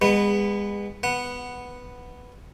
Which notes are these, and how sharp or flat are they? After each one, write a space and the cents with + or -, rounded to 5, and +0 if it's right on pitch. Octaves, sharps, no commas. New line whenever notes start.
G#3 -35 B3 +0 B4 +10
B3 +0 F#5 +0